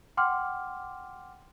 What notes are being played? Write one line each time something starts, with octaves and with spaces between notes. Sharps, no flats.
F#5 G5 C6 D6 F6